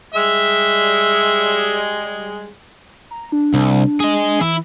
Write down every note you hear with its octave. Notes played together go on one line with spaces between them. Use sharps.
G3 G#3 E5
A#5
D4
C2
G#4 D#5
E3 E4